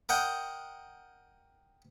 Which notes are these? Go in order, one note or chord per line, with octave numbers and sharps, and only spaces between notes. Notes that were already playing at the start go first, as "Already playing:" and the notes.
A#4 D#5 F#5 G5